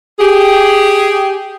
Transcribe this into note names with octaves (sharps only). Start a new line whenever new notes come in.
G4 G#4